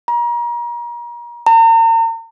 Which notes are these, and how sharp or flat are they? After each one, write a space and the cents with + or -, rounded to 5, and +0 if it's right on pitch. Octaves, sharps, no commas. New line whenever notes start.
A#5 +35
A#5 -40